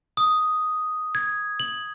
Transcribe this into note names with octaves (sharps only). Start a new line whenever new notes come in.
D#6
G#6
F#7